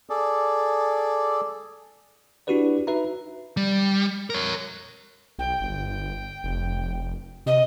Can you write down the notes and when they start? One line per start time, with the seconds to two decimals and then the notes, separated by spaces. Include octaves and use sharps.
0.10 G#4 A4 D5
2.47 D4 E4 F#4 G4 B4 D5
2.87 D#4 F#4 B4 E5 A#5
3.57 G3
4.30 A#4 C#5
5.39 B1 G5
5.60 G1
6.44 F1
7.46 C3 D#5